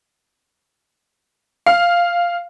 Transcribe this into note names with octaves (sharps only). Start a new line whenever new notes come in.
F5